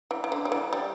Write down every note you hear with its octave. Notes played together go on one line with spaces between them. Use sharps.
E3
E3
D3
G3
E3
G3